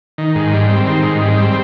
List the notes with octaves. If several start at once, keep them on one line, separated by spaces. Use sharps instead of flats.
D#3
G#2
G3
C4
D#3
G#2
G3
C4